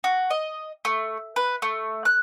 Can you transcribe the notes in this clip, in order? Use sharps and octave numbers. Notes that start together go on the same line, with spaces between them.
F#4
D#5
A3
B4
A3
F#6